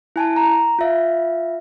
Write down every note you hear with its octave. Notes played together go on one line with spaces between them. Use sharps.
E4 G#5 A5
A#5
F4 E5 F5